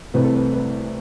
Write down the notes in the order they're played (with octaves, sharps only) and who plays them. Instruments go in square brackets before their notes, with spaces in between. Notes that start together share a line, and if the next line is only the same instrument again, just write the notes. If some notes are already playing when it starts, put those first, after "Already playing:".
[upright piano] C2 C3 E3 A3 C4 B4
A4
B4
B4